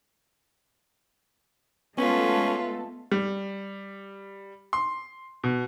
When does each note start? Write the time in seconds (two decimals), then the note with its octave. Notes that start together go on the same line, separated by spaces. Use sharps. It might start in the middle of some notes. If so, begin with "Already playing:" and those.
1.98 G#3 A3 B3 C#4 F4 A4 B4
3.12 G3
4.73 C6
5.44 B2